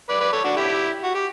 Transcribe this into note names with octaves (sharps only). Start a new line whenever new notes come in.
B4 D5
B4 D5
A4 C#5
D4 F#4
E4 G4
F#4
G4